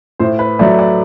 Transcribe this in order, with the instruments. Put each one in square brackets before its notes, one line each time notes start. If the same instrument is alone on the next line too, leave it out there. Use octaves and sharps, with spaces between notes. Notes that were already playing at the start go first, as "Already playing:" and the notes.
[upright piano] A2 C5
B4
F#3 A3 D5
D5